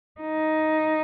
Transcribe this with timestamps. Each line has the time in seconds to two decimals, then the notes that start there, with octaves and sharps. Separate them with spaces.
0.21 D#4